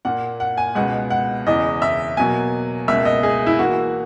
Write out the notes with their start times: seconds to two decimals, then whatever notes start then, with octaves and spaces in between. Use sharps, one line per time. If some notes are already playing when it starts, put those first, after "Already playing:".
0.05 A#2 A#3 F#5
0.40 F#5
0.58 G#5
0.75 C#2 B2 G#3 B3 F#5
1.10 F#5
1.46 E2 C#3 E3 D#5
1.82 E5
2.17 B2 F#3 A#3 G#5
2.88 C#2 B2 A#3 E5
3.05 D#5
3.23 G#4
3.47 E4
3.59 E3 A#3 F#4